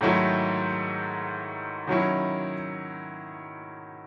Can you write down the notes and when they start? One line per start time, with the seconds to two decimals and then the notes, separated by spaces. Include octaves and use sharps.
0.01 G#2 D#3 F#3 A3 E4
1.87 D#3 F#3 C#4 E4